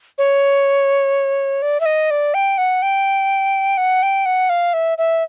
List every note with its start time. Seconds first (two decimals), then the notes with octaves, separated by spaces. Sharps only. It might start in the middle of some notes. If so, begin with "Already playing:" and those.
0.18 C#5
1.62 D5
1.80 E5
1.86 D#5
2.10 D5
2.34 G5
2.58 F#5
2.82 G5
3.77 F#5
4.03 G5
4.26 F#5
4.49 F5
4.73 E5
4.98 E5